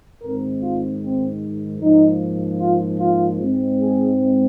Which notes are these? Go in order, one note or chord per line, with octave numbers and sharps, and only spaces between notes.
G#2 D#3 G#3 C4 A#4
F4
C4
G#2 F3 A#3 D#4
F4
F4
G#2 G#3 C4
G#4